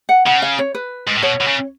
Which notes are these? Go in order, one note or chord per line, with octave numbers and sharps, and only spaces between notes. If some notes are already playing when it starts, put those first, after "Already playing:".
F#5
C#3 F#5
F5
C#5
B4
G#2
A2
B2 C#5
B2
C#3